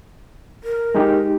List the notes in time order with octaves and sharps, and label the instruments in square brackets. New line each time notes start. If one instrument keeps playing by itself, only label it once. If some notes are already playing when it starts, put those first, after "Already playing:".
[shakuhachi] A#4
[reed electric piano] G#3 D#4 G4